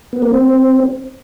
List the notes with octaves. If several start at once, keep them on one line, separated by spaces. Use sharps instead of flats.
B3
A#3
C4